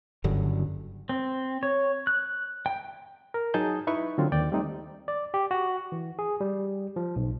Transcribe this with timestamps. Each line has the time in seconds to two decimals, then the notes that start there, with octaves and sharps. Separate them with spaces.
0.24 F#1 G2 D3 F#3
1.09 C4
1.63 C#5
2.07 F#6
2.66 G5
3.34 A#4
3.54 F#3 D#4 G#4 D#5 A5 G6
3.87 D#4 E4 B4 C#6
4.18 D3 F#3 C4 F4
4.32 D#2 D5 G5
4.52 G3 A3 C4 D#4
5.08 D5
5.34 G4
5.51 F#4
5.92 E3
6.19 G#4
6.41 G3
6.96 F3
7.16 B1